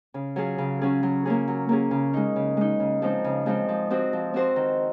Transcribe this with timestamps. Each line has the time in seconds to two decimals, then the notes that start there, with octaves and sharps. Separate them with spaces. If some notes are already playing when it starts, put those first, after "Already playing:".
0.14 C#3
0.36 F#3 C#4 F4 G#4
0.58 C#3
0.81 F#3 C#4 F4 G#4
1.03 F#3
1.26 A#3 C#4 G#4
1.48 F#3
1.69 A#3 C#4 G#4
1.91 C#3
2.13 G#3 D#4
2.36 C#3
2.57 G#3 D#4
2.80 C#3
3.02 F3 G#3 C4 D#4
3.24 C#3
3.46 F3 G#3 C4 D#4
3.69 F3
3.90 C4 F#4 C5
4.13 F3
4.34 C4 F#4 C5
4.56 D#3